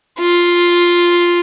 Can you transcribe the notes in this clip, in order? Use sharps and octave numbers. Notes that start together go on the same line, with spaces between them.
F4